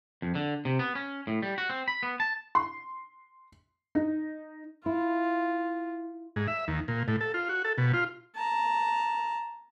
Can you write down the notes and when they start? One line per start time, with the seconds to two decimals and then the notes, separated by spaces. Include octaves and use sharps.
0.22 F2
0.35 D3
0.65 C3
0.79 B3
0.95 C#4
1.27 A2
1.43 G3
1.58 F#4
1.69 C4
1.88 B5
2.03 B3
2.20 A5
2.55 C6
3.95 D#4
4.86 E4 F4
6.36 G#2
6.48 E5
6.68 D#2
6.88 A#2
7.08 A2
7.21 A4
7.34 F4
7.49 F#4
7.65 A4
7.78 B2
7.94 F4
8.36 A5 A#5